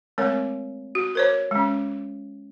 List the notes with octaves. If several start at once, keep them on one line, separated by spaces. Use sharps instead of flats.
G#3 A3 C4 A#4 C#5
F#4
A#4 C5 C#5
G#3 C#4